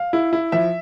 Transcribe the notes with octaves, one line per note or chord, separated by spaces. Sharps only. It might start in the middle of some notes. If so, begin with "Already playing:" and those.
Already playing: F5
E4
E4
F3 E5